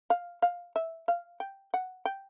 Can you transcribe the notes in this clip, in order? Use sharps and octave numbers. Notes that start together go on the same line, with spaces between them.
F5
F5
E5
F5
G5
F#5
G5